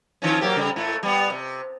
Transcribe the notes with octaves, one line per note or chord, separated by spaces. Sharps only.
D#3 F3 C#4
F#3 A#3 G4
C#3 G3
A2 A3
G3 B3
C3